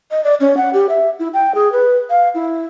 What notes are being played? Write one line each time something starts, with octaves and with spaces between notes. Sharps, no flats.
D#5
D5
C#4
F#5
G4
E5
E4
G5
G#4
B4
F5
E4